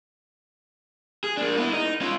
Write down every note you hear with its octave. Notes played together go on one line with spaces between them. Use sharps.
G#4
A#3 D4
B3 E4
D#4
C#4 F4